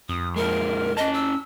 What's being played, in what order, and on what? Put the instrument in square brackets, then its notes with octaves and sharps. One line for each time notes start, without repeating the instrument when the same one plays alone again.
[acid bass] F2 [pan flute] D#6
[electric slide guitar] A#2 G#3 [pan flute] A#4
[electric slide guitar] C#4 A5 [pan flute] D#5
[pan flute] E6